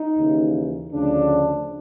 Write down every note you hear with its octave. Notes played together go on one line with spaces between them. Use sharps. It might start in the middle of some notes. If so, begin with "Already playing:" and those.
Already playing: D#4
D#2 C#3 E3
D2 C#3 F3 D4